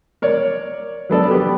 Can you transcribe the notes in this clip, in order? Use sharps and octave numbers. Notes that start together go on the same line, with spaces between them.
A#4 C#5 D5
F#3 B3 A4 D5
B3 G4